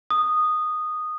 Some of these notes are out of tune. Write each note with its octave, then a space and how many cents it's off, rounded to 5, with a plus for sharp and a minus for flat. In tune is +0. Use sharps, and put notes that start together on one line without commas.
D#6 -10